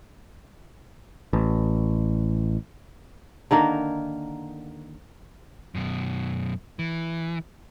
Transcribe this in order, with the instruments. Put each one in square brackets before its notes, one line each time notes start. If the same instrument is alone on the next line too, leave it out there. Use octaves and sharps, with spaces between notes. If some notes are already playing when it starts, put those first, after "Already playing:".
[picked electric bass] A1
[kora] D3 D#3 A#3 A#4
[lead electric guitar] F#2 B2
E3